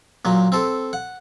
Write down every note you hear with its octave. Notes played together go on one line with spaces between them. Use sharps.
A#2 F#3
C4 A4
F#5